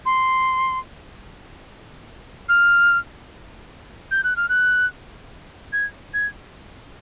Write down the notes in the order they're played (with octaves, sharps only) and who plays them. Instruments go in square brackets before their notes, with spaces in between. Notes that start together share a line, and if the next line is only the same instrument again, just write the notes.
[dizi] C6
F6
G6
F#6
F6
F#6
G#6
G#6